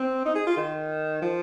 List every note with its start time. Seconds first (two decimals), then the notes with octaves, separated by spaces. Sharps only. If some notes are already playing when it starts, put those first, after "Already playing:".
Already playing: C4
0.25 D#4
0.35 G#4
0.46 F4
0.57 D#3
1.22 F3